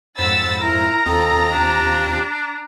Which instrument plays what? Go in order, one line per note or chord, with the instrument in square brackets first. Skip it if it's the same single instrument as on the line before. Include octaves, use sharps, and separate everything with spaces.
[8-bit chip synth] F2 G#2 C5 [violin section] F#5 E6 A6 [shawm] B5
[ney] E4 [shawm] A#4 [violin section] A#5
[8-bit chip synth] D#2 C4 F4 [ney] A4 [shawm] D#5
[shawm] D4 [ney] G4